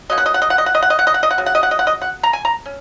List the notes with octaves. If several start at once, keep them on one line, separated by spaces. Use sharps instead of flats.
F#3 A#3 C#4 D#5
F#5
D#5
F#5
D#5
F#5
D#5
F#5
D#5
F#5
D#5
F#5
D#5
F#5
D#5
F#5
C#3 F#3
F#5
D#5
F#5
D#5
F#5
D#5
F#5
A#5
G#5
A#5
C#4